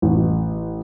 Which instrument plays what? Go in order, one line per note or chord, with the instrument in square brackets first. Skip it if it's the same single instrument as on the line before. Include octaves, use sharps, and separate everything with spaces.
[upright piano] A1